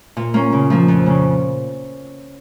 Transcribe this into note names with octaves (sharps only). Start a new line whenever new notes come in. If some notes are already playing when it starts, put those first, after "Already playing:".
A#2
A#3 C#4
C#3
F3 A#3
F2
C#3 A#3 C#4